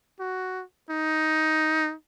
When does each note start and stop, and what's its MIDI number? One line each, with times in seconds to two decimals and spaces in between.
0.20 0.64 66
0.90 1.95 63